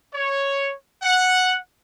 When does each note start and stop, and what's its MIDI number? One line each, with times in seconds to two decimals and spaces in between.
0.14 0.72 73
1.02 1.58 78